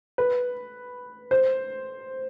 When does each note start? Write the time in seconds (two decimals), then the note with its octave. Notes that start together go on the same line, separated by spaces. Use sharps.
0.18 B4
1.31 C5